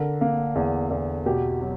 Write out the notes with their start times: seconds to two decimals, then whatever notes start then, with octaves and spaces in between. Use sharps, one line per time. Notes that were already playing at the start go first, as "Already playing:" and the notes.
Already playing: D3 A#4
0.21 A#3
0.55 E2
0.91 E2
1.26 B2 G4
1.61 F#3